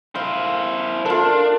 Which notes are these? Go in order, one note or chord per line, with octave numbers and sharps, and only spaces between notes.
E4 C5 F5
D4 F4 A4 A#4